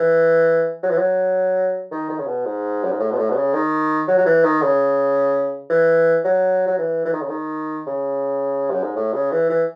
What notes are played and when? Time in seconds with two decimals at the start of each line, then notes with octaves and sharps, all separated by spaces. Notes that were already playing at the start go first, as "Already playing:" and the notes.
Already playing: E3
0.83 F#3
0.90 E3
0.98 F#3
1.92 D#3
2.09 D#3
2.19 C#3
2.27 B2
2.46 G#2
2.84 F#2
2.92 G#2
3.00 A2
3.12 B2
3.18 A2
3.30 B2
3.36 C#3
3.54 D#3
4.08 F#3
4.18 F#3
4.26 E3
4.44 D#3
4.62 C#3
5.70 E3
6.24 F#3
6.67 F#3
6.79 E3
7.05 E3
7.13 D#3
7.22 C#3
7.29 D#3
7.87 C#3
8.71 F#2
8.83 G#2
8.96 A2
9.13 C#3
9.31 E3
9.50 E3